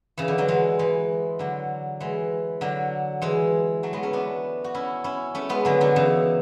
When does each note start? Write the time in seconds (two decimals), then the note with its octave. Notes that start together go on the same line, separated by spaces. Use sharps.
0.17 C#3 E3
0.28 D3
0.38 D3 F#3
0.48 E3 G#3
0.79 E3 G#3
1.39 D3 F#3
2.00 E3 G#3
2.61 D3 F#3
3.22 E3 G#3
3.83 F#3 A3
3.93 G#3 B3
4.03 A3 C#4
4.13 B3 D4
4.64 F#4
4.74 C#4 E4
5.04 C#4 E4
5.35 A3 C#4
5.49 G#3 B3
5.65 D3 F#3
5.81 D3 F#3
5.96 C#3 E3